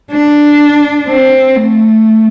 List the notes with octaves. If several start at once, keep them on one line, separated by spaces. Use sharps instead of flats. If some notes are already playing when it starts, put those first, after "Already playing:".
D4
C4
A3